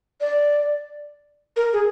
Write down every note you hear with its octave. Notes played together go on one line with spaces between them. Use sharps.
D5
A#4
G#4